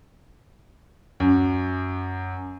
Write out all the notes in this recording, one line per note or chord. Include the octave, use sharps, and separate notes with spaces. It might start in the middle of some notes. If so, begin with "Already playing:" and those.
F#2